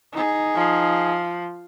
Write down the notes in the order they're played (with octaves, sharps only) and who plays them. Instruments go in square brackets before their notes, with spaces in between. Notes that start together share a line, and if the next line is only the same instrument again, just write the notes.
[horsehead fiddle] D#4 G#4
[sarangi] F3